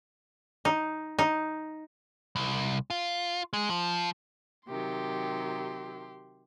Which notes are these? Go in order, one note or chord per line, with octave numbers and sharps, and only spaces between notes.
D#4
D#4
C2
F4
G#3
F3
C3 D#3 F#3 G4 C6